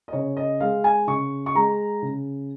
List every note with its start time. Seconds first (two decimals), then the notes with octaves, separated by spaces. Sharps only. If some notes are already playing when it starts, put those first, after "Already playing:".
0.08 D#5
0.13 C#3 C#5
0.37 D#5
0.60 G#3 F5
0.84 G#5
1.07 C#3 C#6
1.46 C#6
1.55 G#3 A#5
2.02 C#3